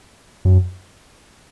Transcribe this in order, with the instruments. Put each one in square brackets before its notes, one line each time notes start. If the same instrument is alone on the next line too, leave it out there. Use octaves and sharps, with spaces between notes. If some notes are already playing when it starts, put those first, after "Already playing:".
[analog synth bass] F#2